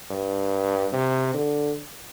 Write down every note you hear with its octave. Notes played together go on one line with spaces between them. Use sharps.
G2
C3
D3